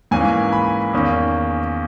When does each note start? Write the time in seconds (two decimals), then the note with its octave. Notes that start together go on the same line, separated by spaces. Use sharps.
0.11 G#2 E3 A#3 C#4 G#5
0.53 B5
0.93 E2 D#3 A#3 C#4